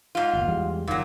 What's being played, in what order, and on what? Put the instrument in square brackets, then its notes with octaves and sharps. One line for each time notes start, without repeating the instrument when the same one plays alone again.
[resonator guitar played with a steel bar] G#2 F4
[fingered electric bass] G1 D#2
E2 G3 G#3
[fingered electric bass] F#1 D#3 [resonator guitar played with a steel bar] A#2 F#3